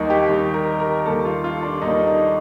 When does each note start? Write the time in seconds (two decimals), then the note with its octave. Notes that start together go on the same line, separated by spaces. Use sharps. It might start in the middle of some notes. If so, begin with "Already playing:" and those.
Already playing: D#2 D#3 G3 D#4
0.10 G4
0.29 D#2 D#3 G3
0.54 A#4
0.80 A#4
1.06 D#2 D#3 G3 A#3 A4
1.25 F4
1.44 F4
1.63 D4
1.82 D#2 D#3 G3 A#3 D#4
2.07 D#4